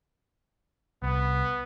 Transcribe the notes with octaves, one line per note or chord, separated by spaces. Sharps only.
C2 B3